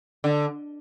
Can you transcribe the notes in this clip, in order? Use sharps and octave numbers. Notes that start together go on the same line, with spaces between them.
D3